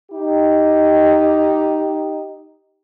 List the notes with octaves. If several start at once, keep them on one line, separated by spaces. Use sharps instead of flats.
D#4 G4